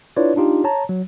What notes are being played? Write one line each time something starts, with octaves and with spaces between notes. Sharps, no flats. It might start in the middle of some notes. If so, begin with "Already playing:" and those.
D4 E4 F4 B4 C#5 D5
D4 D#4 F4 G4
C#5 A5 A#5
F#3